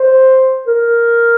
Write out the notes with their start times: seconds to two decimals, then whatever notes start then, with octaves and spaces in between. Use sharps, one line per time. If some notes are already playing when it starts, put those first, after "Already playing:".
Already playing: C5
0.68 A#4